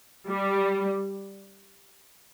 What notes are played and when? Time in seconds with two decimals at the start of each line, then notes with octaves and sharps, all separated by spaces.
0.28 G3